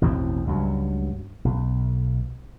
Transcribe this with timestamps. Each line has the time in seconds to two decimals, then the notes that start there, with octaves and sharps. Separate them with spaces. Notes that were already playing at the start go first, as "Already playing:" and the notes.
0.02 A1 E2 B2 C4
0.47 C#2 G2 F#3
1.45 B1